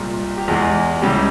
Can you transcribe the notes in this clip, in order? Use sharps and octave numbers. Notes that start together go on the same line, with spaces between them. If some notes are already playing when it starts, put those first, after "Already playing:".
Already playing: C2 A#2 G#3
G4
E2 E3 G#3 G#4
C#2 C#3 E3 G3 G4